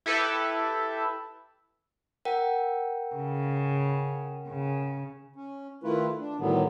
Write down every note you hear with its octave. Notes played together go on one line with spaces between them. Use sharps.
E4 G4 A4 B4 E5
A#4 F#5 G5
C#3
C#3
C#4
D#3 A3 E4 F4 B4
D4
A2 D3 D#3 F#3 G3 B3